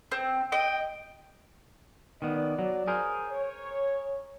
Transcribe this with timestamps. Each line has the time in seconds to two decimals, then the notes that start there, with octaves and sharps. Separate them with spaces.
0.12 C4
0.52 D#5 G5
2.22 D#3 B3 D5
2.59 F#3
2.88 G#4 A#4 C5
3.28 C#5